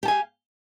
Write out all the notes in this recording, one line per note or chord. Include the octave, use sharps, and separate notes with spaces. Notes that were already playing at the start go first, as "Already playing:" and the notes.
G4 F5 G#5 A5